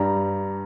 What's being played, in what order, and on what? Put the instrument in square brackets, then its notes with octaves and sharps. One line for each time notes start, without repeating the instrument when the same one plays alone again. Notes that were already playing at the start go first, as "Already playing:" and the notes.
Already playing: [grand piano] G2 G3 A#5